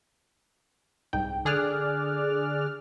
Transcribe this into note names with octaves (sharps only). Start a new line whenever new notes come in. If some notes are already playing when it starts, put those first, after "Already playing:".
C2 G#2 G5
D3 G#4 D5 F6 F#6